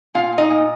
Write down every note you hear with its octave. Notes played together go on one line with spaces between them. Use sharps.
A#2 F4 F5
A#2
D#4 D#5
A#2